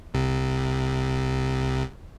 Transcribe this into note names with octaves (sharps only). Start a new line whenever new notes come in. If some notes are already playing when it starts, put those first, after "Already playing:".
C2 C3